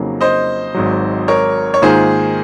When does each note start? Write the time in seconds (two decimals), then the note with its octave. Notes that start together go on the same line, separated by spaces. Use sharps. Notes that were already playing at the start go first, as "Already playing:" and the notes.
Already playing: F2 C#3 F#3 A#3 D#4
0.21 C5 D#5
0.74 G#1 G#2 F#3
1.28 A#4 C#5
1.74 C#5
1.82 G#2 D#3 A#3 F4 G#4 C5